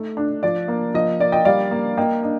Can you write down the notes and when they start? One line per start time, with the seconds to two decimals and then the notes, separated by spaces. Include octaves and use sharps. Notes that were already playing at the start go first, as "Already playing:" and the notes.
Already playing: A3 D#4
0.17 D4
0.43 F3 D5
0.68 A#3
0.94 F3 D#5
1.20 A#3 D5
1.32 D#5 G5
1.45 G3 D5 F5
1.71 A#3
1.97 A#3 D#5 G5
2.23 D4 D#5